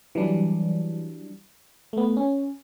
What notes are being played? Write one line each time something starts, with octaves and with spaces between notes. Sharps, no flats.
E3 F#3 G3 D4
A3 B3
C#4